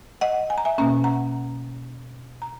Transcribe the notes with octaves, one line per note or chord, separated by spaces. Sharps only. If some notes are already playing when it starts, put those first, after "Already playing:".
D#5 F#5
G#5
A#5
E5 G#5
B2 A#3 C#4 A#5
F#5 A#5
A#5